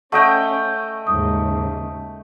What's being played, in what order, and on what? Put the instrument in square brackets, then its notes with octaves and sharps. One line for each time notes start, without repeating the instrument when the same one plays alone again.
[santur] A3 D#5 G5 [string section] C#4 [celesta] F#5 C#6
[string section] D#2 G#2 C#3 [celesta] D#6